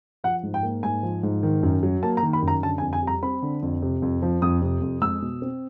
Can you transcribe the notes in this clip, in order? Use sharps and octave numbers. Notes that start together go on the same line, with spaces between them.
F3 F#5
G#2
G5
A#3
G#2 G#5
F3
G#2
D#3
F#2
F#3
A#3 A5
A#5
D#3
B5
F#2
A#5
D3 A5
G#5
F2
G#5
G3 A#5
C4 B5
D3
F2
C3
F2
F3
F2 D#6
C3
F2
G#3 E6
B2
C4